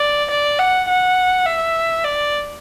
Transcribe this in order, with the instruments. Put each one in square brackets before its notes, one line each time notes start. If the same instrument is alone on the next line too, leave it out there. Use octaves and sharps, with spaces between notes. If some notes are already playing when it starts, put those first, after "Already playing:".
Already playing: [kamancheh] D5
D5
F#5
F#5
E5
D5